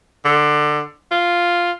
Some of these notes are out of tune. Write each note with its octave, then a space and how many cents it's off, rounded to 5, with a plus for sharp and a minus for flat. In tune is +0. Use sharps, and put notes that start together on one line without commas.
D3 +20
F4 +0